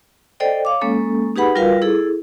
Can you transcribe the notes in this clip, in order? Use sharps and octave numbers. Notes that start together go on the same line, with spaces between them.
A4 C5 D5 D#5 G5
C#5 F5 D6
G#3 A#3 C#4 A4
D#4 G4 G#4 B4 F#5 B5
G3 F4 F#4 A#4 B4 F5
E4 G#4 A4